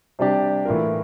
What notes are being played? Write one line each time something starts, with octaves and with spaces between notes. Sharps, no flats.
C3 G3 D4 G4 D5
A2 E3 A#3 F4 A#4